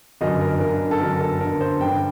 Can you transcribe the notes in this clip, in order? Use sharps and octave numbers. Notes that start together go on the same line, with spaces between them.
G1 F#2 D3 D#5
A#4
G1 F#2 D3 A#4
A4
G1 F#2 D3 A#4
A4
G1 F#2 D3 A#4
C5
G1 G2 D3 G5